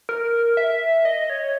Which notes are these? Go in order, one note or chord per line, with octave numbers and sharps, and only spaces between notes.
A#4
E5
D#5
C#5